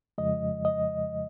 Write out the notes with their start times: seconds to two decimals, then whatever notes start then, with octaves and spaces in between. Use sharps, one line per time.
0.18 F2 C#3 F3 G#3 D#5
0.65 D#5